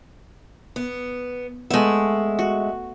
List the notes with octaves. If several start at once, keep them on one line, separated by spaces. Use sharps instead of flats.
B3
G#3 A3 B3 E5
F#4